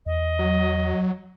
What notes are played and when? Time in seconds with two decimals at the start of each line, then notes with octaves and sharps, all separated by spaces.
0.06 E2 D#5
0.39 F#3